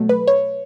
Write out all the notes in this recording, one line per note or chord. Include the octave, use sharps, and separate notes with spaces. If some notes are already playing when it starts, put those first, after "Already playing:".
Already playing: B2 F#3 A3
B4
C#5